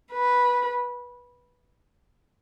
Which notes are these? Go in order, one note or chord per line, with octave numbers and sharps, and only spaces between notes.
B4